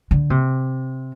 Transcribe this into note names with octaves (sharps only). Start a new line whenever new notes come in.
D3
C3